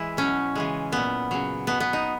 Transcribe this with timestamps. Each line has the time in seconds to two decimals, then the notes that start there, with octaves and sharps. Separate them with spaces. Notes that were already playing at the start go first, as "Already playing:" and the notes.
Already playing: E3 G#3 E4
0.17 B2 F#3 C#4
0.55 C#3 E3 G#3
0.92 A#2 F#3 B3
1.31 C#3 F#3
1.67 B2 F#3 B3
1.80 B3
1.93 D#4